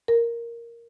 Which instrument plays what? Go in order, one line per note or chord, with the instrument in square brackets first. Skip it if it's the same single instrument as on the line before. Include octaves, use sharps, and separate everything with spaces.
[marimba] A#4